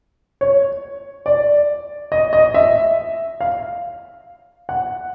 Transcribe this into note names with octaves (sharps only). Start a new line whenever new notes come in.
C#5
D5
D#5
D#5
E5
F5
F#5